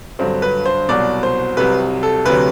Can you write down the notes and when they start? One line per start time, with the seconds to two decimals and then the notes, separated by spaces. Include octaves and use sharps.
0.19 G2 D3 F#3 C4
0.42 B4
0.66 C5
0.89 C2 B2 F#3 D5
1.23 C5
1.57 C2 C3 F#3 B4
2.03 A4
2.26 D2 C3 F#3 B4